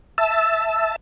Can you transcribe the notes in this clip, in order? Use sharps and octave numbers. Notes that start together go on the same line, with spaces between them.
E5 A5 E6